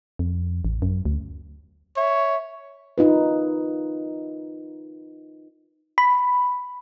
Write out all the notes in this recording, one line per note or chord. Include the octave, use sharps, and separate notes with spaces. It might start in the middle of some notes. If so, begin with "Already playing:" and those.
F2
A1
F#2
D2
C#5 E5
D#4 F4 B4
B5